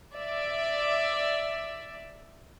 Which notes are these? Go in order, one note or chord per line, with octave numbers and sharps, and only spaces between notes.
D5 E5